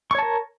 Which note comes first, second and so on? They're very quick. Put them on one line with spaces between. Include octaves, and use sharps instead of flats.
C#6 C#5 A5 A#4